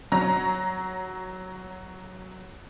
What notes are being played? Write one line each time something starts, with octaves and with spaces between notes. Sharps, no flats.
F#3 A#5